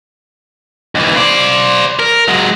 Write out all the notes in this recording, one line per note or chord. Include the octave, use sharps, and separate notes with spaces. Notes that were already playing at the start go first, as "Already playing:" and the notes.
D#2 E3
C5 D5
A#4
F#3 G#3